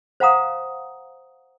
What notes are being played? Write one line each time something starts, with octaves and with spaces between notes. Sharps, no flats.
C5 F5 F#5 A#5 D#6